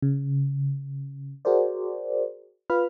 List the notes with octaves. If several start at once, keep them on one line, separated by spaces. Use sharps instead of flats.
C#3
F#4 G#4 A#4 C5 D5
F4 B4 B5 F6